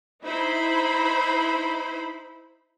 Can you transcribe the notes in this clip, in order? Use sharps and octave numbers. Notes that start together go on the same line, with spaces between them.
D#4 E4 C5 B5